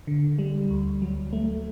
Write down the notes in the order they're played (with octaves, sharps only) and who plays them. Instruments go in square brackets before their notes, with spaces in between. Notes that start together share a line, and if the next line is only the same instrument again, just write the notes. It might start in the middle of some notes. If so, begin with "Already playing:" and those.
[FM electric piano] D3
G3
D2
F#3
A3